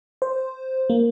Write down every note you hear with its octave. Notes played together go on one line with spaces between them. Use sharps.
C5
A#3